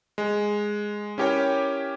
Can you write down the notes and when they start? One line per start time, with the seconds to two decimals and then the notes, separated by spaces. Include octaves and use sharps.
0.18 G#3
1.18 C#4 E4 G4 A#4 C#5 G5